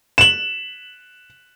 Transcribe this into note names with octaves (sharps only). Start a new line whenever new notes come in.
E7 F#7